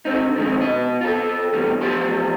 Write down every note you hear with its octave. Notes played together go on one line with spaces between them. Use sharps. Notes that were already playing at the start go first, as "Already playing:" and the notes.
D3 C4 D#4
D3 D#3 F3 F#3 G#3 C4
B2 D#5
F4 A4
G2 B2 E3 G3
E2 F3 F4 G4 A5 C6